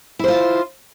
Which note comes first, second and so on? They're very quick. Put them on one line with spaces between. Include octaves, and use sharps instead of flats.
E4 C5 F4